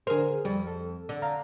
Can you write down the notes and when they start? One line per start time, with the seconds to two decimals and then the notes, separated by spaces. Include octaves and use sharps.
0.07 D3 G#4 A#4 C5
0.45 F2 G3
0.67 A4
1.09 D3
1.22 F5 A#5